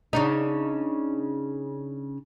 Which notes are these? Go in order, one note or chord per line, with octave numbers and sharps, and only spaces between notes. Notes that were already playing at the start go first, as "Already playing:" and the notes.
C#3 D4 D#4